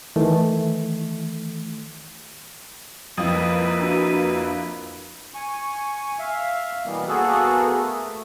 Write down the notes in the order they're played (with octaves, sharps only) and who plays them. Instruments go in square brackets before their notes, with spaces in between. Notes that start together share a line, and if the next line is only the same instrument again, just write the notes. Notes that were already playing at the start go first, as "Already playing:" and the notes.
[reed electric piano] D#3 E3 A3
[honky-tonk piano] F2 F3 [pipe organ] A#3 E4 B4 [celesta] D#6
[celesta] D4 F#4 D#7
[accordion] G#5 C#6
E5 F5
B2 E3 G3 A#3 B3
A#3 B3 F#4 G#4 A4
A3